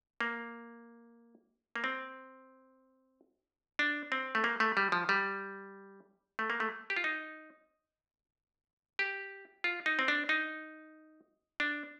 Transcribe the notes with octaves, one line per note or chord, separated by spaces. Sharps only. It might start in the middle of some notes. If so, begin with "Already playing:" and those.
A#3
A#3
C4
D4
C4
A3
A#3
A3
G3
F3
G3
A3
A#3
A3
G4
F4
D#4
G4
F4
D#4
C4
D4
D#4
D4